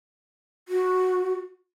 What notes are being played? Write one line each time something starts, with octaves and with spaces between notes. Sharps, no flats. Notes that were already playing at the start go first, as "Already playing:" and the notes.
F#4